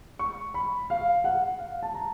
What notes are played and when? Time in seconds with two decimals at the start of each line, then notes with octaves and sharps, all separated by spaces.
0.19 C#6
0.54 B5
0.90 F5
1.24 F#5
1.59 F5
1.83 A5
1.94 A#5